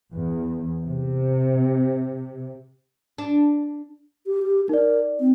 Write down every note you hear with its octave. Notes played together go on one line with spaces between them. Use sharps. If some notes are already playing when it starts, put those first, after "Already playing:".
E2
C3
D4
G4
G4
D#4 A#4 D5
C4